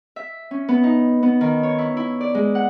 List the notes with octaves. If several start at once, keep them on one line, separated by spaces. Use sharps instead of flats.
E5
C#4
B3
D#4
B3
D#3
C#5
E4
E4
D5
G#3
F#5